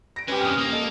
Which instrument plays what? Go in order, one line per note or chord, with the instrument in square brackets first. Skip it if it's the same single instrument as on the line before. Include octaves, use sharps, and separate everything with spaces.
[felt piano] A#6 D7
[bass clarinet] C#4 [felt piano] G4 B4 [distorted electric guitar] D#5 G#5
[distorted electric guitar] F2 D3 [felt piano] D#6 F6
[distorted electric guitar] A#3
[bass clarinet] A4 [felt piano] D#5